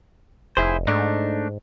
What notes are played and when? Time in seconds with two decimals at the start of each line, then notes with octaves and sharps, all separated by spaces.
0.57 F1 E4 G#4 C5
0.87 G#2 A3 D4 D#4